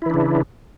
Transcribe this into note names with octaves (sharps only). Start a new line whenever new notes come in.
C#3 E3 D4 E4